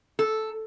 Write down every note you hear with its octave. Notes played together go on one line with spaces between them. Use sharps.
A4